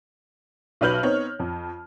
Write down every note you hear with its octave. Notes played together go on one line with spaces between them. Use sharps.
B1 F#4 B4 F6 G6 F#7
B3 C4 D#4 C#5
F2